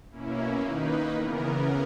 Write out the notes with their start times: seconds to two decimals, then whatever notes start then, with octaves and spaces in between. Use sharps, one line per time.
0.11 B2 A#3 C#4 E4
0.61 D#3 A#3 D#4 B4
1.12 C#3 E3 B3 A#4